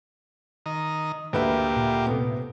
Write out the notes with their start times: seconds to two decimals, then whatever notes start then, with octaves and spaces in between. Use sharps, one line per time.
0.66 D#3 D#5 A#5
1.33 D2 A#3 G4 B4 E5
1.77 A#2
2.06 C3 A3 B3